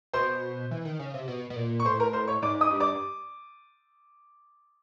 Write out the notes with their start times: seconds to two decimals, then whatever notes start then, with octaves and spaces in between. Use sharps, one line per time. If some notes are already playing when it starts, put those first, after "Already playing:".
0.13 B2 C5 C6
0.71 E3
0.85 D#3
0.99 C#3
1.14 C3
1.28 B2
1.50 B2
1.56 A#2
1.80 C#6
1.85 A2 C5 C6
2.00 A#4 A#5
2.13 C5 C6
2.27 C#5 C#6
2.42 G#2 D5 D6
2.61 D#5 D#6
2.71 G2
2.80 D5 D6